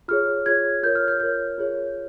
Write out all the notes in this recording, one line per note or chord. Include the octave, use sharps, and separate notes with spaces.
F4 G#4 C#5 F6
F4 G#4 C#5 G#6
F4 A#4 C#5 G6
F6
G6
F4 A#4 C#5 G6
F4 G#4 C#5